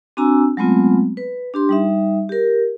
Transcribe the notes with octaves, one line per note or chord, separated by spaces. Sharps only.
C4 D4 F#4 G#5 A#5 E6
F#3 G#3 A3 B3 C4 F4
B4
D4 G4 C6
G3 D#4 E5
G4 A#4